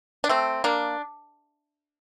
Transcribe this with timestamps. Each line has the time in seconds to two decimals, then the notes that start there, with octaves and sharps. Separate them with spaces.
0.24 D4
0.29 A3 C4
0.64 A#3 D4